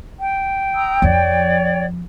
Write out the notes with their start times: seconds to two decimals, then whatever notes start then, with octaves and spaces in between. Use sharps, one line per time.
0.20 G5
0.75 A#5 D#6 E6
1.02 F2 F3 C#5 D5